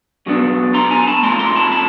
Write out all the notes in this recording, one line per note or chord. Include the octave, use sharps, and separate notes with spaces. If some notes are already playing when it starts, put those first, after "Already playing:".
B2 F#3 B3 D4
A#5 C6
G#5 A#5
A5 B5
C3 F3 A3 A#5 C6
A#5 C6
A5 B5
A5 B5